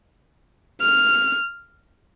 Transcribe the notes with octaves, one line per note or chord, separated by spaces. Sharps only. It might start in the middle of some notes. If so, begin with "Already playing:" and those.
F6